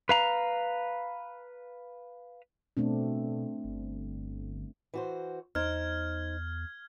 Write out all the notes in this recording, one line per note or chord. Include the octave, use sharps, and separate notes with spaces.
B4 F5 A#5
B2 A3 C4 D4
G1
E3 F#4 C5
E2 D#4 C5 F6 G#6